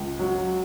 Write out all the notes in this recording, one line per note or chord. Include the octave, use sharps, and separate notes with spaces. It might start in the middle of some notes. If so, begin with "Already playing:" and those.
Already playing: C#2
F#3